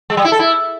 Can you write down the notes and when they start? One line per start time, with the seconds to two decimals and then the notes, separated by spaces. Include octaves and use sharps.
0.10 G#3
0.17 G3
0.25 E4
0.32 A4
0.39 E4